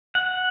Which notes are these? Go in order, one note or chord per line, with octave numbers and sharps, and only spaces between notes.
F#5